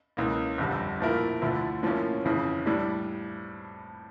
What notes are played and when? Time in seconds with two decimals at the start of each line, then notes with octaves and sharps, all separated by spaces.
0.17 C#2 C#3 E3 A#3
0.58 G1 F2 D3 G3
1.00 A#2 F3 A3 E4 A#4
1.41 D2 D3 F3 A3 E4
1.83 A2 F3 A#3 C#4
2.25 G1 F2 C#3 E3
2.66 A2 G3 D4